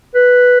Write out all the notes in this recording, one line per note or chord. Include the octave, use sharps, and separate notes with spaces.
B4